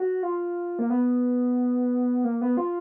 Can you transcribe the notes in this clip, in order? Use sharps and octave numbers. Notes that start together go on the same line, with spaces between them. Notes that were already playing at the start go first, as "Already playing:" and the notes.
Already playing: F#4
F4
A#3
B3
A#3
B3
F4